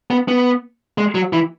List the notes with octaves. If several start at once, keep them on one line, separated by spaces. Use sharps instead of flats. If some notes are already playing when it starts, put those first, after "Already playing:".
B3
B3
G#3
F#3
E3